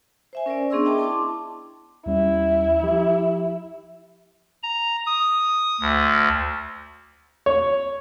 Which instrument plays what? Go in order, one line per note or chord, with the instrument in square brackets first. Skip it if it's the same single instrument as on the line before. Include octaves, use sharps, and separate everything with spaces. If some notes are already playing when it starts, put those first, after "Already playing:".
[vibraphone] C5 E5 G#5
C#4 A#4 C5 D5
B3 D4 G#4 C6 C#6 E6
D#5 E5 G5 A5 D6
E4 A5 C6 D6
[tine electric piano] D#2 G3 C#4 [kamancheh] E4
[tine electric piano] F3 G4
[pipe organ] A#5
D#6
D2
[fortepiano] C#5